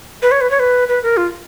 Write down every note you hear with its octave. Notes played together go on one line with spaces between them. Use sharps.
B4
C#5
B4
C#5
B4
B4
A#4
F4